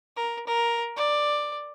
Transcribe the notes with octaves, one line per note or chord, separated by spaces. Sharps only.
A#4
A#4
D5